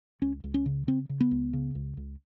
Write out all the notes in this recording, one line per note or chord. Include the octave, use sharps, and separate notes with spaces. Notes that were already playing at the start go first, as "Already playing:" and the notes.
C#2 C#4
C#2
C#4
C#3
C#3 C4
C#3
B3
C#2
C#3
C#2
C#2